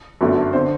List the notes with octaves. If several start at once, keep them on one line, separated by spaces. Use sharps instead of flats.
G1 F#2 D3 F#3 A3
D3 C5